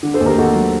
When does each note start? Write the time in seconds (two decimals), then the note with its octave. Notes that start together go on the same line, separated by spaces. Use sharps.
0.03 D3
0.14 A4 C5
0.21 D#2
0.26 G4 A#4
0.38 D#2 F#4 A4
0.56 F#3